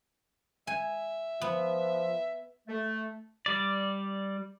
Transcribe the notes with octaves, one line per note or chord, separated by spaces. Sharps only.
E5 G#5
F3 B3
A3
G3 D5